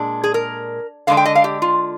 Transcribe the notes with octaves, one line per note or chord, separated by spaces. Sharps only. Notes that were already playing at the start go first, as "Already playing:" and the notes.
Already playing: A#2 G#3 D4
G#4
A#4
D3 G#3 D4 F5
G5
D#5
F5
G4
F4